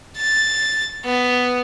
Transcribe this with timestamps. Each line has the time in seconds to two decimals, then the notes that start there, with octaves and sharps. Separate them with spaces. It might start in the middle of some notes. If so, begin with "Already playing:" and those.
0.17 A6
1.05 B3